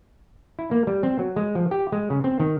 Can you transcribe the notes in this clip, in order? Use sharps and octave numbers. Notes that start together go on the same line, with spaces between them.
E4
A#3
G3
C4
F#3
G#3
F3
G4
G#3
C#3
C4
D#3